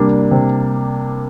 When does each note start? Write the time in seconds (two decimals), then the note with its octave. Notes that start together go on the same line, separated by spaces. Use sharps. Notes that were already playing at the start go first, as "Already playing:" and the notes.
Already playing: C3 G3 A#3 D4
0.31 C3